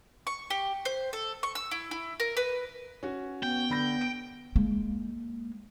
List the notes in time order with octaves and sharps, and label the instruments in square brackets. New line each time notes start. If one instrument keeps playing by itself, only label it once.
[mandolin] C#6
G4
C5
A4
C#6
E6
E4
E4
A#4
B4
[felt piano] C#4 F#4
[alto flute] B3 [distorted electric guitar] G5
[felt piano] D3 B5 A#6
D7
[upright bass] G#3 A#3